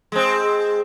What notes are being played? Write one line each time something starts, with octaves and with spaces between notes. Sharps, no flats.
G#3 C4